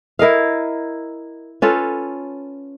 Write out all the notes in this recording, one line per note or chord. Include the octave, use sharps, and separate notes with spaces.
E4 A#4 D#5 F5
C#4 F4 A4 B4